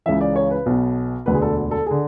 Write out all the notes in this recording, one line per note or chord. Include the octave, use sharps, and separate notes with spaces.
C#2 C#3 E3 E5
D5
C#5
B4
B1 B2
E1 D2 D3 B4
G#4
A4
A4
D3 G#4